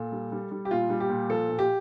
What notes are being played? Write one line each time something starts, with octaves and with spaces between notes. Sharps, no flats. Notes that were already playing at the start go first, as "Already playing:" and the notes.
Already playing: A#2 A4
G3
G3
G3
G4
A#2 F4
G3
G4
A#2
F3 A4
A#2
G4